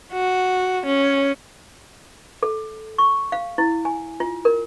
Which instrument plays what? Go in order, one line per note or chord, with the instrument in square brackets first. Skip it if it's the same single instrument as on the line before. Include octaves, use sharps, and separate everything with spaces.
[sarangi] F#4
C#4
[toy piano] A4
C#6
F5
E4
G#5
F4
A#4